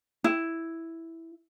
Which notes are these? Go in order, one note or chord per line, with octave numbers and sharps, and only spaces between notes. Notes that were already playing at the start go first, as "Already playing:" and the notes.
E4